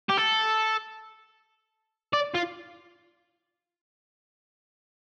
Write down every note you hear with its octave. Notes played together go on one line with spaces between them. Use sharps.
G4
A4
D5
F4